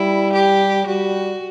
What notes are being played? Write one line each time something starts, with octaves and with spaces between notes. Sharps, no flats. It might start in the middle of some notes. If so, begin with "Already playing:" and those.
Already playing: G3 E4
G4
G3 F#4